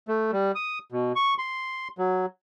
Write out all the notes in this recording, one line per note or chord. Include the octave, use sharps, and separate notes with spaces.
A3
G3
D#6
B2
C#6
C6
F#3